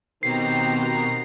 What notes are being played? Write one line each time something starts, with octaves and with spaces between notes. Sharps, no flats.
B2 D#3 C4 G4 A#5 C7